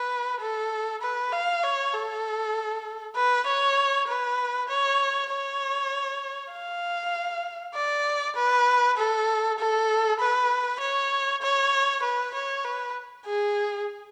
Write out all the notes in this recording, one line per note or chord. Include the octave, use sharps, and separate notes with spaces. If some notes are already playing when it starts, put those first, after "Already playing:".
Already playing: B4
A4
B4
F5
C#5
A4
B4
C#5
B4
C#5
C#5
F5
D5
B4
A4
A4
B4
C#5
C#5
B4
C#5
B4
G#4